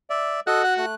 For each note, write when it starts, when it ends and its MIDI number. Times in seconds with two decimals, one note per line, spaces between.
0.10 0.40 74
0.10 0.40 76
0.47 0.86 66
0.47 0.63 69
0.47 0.63 75
0.47 0.63 90
0.64 0.74 78
0.64 0.74 90
0.77 0.95 57
0.77 0.95 90